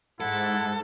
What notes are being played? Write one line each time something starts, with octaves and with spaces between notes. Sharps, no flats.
G#2 E4 A4 F#5